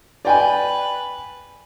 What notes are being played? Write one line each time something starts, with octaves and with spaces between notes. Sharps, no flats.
B4 D5 G5 G#5